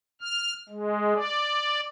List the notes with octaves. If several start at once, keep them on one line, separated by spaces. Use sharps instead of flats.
F6
G#3
D5